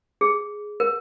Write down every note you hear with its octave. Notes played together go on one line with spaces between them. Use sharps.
G#4
A#4